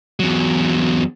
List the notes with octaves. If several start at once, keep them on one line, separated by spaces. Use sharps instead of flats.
E2 F#3